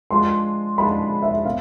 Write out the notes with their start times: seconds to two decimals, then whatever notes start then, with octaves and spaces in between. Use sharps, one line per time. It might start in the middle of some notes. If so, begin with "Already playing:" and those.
0.11 F3 G#3 D4 F4 C6
0.78 F3 G#3 D4 F4 B5
1.22 E5
1.45 B3 F5